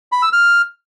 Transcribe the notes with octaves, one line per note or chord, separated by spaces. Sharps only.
B5
E6
F6